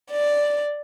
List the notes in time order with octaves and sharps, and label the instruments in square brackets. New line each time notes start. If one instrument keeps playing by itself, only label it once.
[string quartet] D5